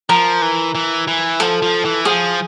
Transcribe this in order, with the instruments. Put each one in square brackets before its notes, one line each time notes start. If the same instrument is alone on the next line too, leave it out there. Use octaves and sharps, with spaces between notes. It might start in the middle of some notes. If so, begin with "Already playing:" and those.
[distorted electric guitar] F3 [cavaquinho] A#4
[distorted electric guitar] E3
E3
E3
[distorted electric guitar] F3 [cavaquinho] A4
[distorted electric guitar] F3
E3
[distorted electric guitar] F3 [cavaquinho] G#4